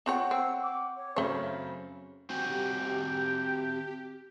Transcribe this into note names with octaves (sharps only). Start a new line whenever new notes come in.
C4 F4 C#5 F#5 G5 C#6
C4 E6
D6
C#5
F#2 C#3 A3 C4 C#5 B5
C4 F#4 G4 G5 G#5